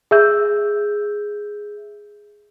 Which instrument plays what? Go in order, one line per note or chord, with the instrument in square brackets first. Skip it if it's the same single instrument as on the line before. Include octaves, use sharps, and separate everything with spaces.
[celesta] G#4 E5 E6 G6